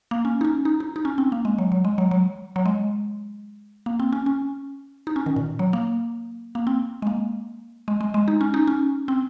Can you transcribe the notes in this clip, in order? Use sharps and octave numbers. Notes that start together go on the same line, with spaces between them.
A#3
C#4
D#4
C#4
D#4
D#4
D#4
C#4
C4
A#3
G#3
F#3
F#3
G#3
F#3
F#3
F#3
G#3
A#3
C4
C#4
C#4
D#4
C#4
D#3
A#2
F#3
A#3
A#3
C4
G#3
A#3
G#3
G#3
G#3
D#4
C#4
D#4
C#4
C4